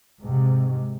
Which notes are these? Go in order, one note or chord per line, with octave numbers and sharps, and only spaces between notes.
G#2 C3